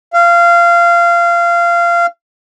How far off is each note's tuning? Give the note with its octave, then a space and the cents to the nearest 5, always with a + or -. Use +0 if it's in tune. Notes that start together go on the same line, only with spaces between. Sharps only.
F5 -20